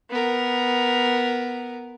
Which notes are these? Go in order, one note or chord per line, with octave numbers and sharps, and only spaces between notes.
B3 A#4